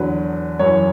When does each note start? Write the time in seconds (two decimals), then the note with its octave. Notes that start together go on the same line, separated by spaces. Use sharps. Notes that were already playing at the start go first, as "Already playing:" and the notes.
Already playing: E2 D3 F#3 B4
0.59 F#2 E3 C#5